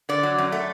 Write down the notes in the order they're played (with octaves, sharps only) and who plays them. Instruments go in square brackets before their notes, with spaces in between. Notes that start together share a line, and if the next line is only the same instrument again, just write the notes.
[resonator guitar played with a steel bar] D3 D5
F#3
F#2
A3